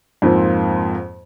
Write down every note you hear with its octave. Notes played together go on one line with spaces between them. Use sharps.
F2 G#2 F3 A#3 C4